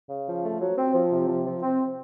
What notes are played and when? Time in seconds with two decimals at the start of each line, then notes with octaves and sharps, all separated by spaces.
0.09 C#3
0.27 F3
0.43 A3
0.60 F#3
0.78 C4
0.94 F3
1.12 C3
1.28 F3
1.45 F3
1.62 C4